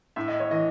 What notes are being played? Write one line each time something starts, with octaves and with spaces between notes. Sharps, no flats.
A2 E5
D#5
C#5
E3 D#5